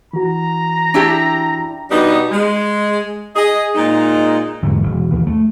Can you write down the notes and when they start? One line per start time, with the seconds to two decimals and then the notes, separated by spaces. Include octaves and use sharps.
0.13 E3 F#4 A#5
0.94 D4 E4 G4
1.91 B2 G3 B3 D4 D#4
2.32 G#3
3.36 G#4 D#5
3.75 A#2 G#3 D#4
4.63 E2 G#2 D3 F#3
4.83 E1
5.14 D#2
5.27 A3